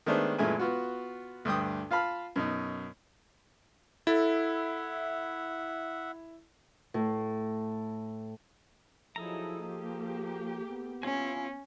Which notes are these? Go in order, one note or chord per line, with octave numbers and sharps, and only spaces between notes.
D#3 G#3 A3 B3 D4 C5
F#2 A#2 E3 G#3 A3 G#5
B3 F4 F#4
D2 G2 G5 D#6
F4 F5 A5 B5 F6
F#2 B2 D#4
E4 A4 E5 F#5
A2
F3 F#3 D#4 E4 G#4 A4 A#5
A#3 G4
B3
C#4 E4 F4 G#5